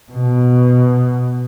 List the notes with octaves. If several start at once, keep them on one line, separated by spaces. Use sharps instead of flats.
B2